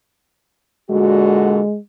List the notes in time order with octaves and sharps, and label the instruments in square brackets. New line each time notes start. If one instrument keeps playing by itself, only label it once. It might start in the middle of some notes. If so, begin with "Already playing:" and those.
[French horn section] A#2 D3 F#4 [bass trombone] G#3